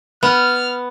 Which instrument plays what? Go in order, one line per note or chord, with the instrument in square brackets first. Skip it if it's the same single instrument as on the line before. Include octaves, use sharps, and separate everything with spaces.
[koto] B3 [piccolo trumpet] F6